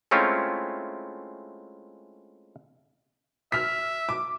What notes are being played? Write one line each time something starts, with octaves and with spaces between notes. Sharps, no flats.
G#3 A3 C4 C#4 E4 F4
E5 F6 B6
D6